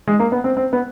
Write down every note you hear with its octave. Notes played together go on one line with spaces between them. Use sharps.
G#3
A#3
B3
C4
C4
B3